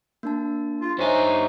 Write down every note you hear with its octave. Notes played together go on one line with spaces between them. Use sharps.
A#3 D4 A5
F4
G2 D#4 C5 C#5 E5 G#5 C#6